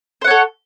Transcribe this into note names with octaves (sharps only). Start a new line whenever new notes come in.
A4 C5 C#5 F#5